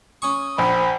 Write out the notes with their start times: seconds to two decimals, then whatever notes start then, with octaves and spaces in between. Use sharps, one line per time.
0.22 C#4 G#5 C#6 D#6
0.58 A#1 C5 B5